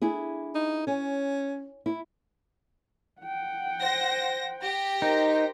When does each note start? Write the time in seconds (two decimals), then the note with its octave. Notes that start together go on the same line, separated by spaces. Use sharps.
0.02 D4 E4 G#4
0.55 D#4
0.87 C#4 C#5 G#5
1.86 E4
3.21 F#5 G5
3.80 C5 A#6
4.61 G4 A#6
5.02 D#4 A#4 C5